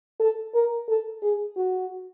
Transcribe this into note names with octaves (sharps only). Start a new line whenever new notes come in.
A4
A#4
A4
G#4
F#4